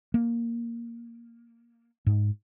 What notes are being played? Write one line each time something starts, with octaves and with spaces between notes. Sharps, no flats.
A#3
G#2